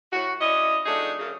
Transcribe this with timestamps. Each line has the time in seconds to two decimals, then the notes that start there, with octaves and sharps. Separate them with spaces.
0.12 A2 F#4
0.40 C#4 E4 D5 D#5
0.85 F2 A3 D4 D#4 F#4 G#4
1.19 F#2 C#3